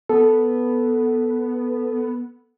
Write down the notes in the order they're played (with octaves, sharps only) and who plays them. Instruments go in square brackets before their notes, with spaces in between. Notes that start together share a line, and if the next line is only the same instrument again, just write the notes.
[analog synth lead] B3 [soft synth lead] A4